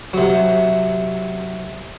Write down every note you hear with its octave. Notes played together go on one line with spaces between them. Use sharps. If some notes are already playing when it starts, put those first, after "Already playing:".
C3 F#3